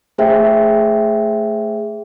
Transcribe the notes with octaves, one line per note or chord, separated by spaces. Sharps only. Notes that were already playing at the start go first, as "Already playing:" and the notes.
A3 G#4 C5 E5 G5